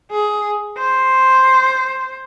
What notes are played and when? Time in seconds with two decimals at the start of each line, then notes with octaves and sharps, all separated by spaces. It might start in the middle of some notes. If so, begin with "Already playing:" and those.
0.11 G#4
0.78 C5